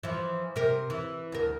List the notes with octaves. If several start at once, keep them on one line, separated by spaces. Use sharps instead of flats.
E3 F3
C3 A#4
E3
D2 A#4